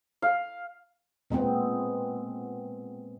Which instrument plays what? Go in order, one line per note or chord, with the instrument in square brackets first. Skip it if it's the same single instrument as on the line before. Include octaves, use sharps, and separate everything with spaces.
[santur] F5
[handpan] A#2 G#3 B3 C4